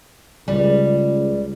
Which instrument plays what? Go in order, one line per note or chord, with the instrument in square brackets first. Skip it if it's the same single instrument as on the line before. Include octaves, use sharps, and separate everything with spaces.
[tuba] C#2 [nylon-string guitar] G3